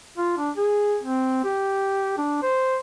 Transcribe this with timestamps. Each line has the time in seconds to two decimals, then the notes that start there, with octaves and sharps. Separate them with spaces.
0.17 F4
0.38 D4
0.57 G#4
1.02 C4
1.44 G4
2.18 D4
2.42 C5